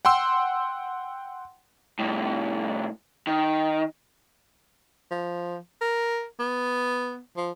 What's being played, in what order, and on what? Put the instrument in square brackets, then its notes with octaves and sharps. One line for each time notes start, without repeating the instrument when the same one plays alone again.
[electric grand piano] F#5 G5 C6 E6
[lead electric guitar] C2 A2
D#3
[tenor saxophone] F3
A#4
B3
F3